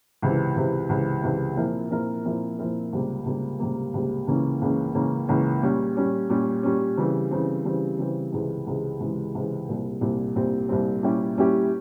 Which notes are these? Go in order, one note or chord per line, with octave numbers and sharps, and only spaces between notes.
C#2 C3 E3
C#2 C3 E3
C#2 C3 E3
C#2 C3 E3
A#2 F3 C4 E4 A#4
A#2 F3 C4 E4 A#4
A#2 F3 C4 E4 A#4
A#2 F3 C4 E4 A#4
C#2 C3 G3 A#3
C#2 C3 G3 A#3
C#2 C3 G3 A#3
C#2 C3 G3 A#3
C#2 C#3 E3 A#3 C#4
C#2 C#3 E3 A#3 C#4
C#2 C#3 E3 A#3 C#4
C#2 C#3 E3 A#3 C#4
A#2 G3 C#4
A#2 G3 C#4
A#2 G3 C#4
A#2 G3 C#4
C#3 E3 G3 C4
C#3 E3 G3 C4
C#3 E3 G3 C4
C#3 E3 G3 C4
C#2 C3 E3 G#3
C#2 C3 E3 G#3
C#2 C3 E3 G#3
C#2 C3 E3 G#3
C2 A#2 G3 C4
C2 A#2 G3 C4
C2 A#2 G3 C4
C2 A#2 G3 C4
A#2 G3 C#4 E4 G4
A#2 G3 C#4 E4 G4